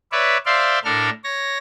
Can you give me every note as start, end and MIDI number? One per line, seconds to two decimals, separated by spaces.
0.12 0.37 71
0.12 0.37 73
0.12 0.37 74
0.12 0.37 76
0.46 0.79 72
0.46 0.79 74
0.46 0.79 76
0.46 0.79 77
0.46 0.79 84
0.84 1.10 45
0.84 1.10 62
0.84 1.10 69
0.84 1.10 70
0.84 1.10 89
1.24 1.58 73
1.24 1.58 94